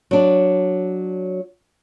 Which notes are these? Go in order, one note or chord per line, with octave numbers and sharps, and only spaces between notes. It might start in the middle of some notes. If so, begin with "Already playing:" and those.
F#3 D4